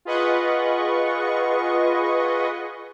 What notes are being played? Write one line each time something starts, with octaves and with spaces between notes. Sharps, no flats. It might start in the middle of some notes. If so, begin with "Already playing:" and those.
F4 G#4 B4 D#5 F#5 C#6